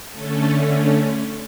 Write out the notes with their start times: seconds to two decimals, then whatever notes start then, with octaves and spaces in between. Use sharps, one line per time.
0.11 D3 A3 C#4 A4